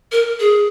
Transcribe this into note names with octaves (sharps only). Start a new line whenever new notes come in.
A#4
G#4